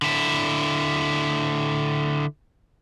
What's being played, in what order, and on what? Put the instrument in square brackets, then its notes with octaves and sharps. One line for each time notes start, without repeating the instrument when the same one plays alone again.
[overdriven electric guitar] D3 E4